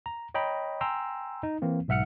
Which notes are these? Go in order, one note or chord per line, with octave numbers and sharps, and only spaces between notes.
A#5
C#5 D#5 G5 A#5 B5
G5 G#5 A#5 C6 E6
D#4
E3 A#3 C4
B1 G#2 E5 F#5 F6 C#7